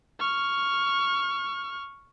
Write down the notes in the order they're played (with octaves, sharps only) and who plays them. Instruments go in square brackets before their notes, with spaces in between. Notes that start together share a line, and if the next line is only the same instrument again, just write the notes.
[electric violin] C#6 F6